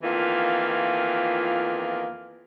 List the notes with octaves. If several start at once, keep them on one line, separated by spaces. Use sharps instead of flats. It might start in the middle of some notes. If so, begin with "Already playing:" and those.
F2 D#3 E3 A#3 B3 F4